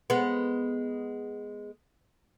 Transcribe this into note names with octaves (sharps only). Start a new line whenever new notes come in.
G#3 B3